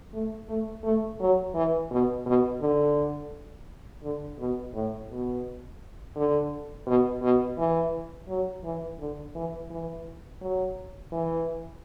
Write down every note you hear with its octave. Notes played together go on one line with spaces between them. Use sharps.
A3
A3
A3
F#3
E3
B2
B2
D3
D3
B2
A2
B2
D3
B2
B2
E3
F#3
E3
D3
E3
E3
F#3
E3